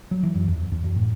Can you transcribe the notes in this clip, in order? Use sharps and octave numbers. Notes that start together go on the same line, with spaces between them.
F#3
E3
F#2
E2
E2
F#2
A2